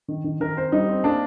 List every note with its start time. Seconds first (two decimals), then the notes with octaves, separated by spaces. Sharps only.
0.08 D#3
0.24 D#3
0.40 D#3 A#4
0.57 C4 C5
0.72 G3 D#4
0.88 C4
1.04 A#3 D4